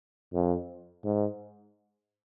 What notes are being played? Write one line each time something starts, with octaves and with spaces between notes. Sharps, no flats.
F2
G#2